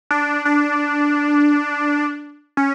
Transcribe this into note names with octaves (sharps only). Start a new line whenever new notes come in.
D4
D4
C#4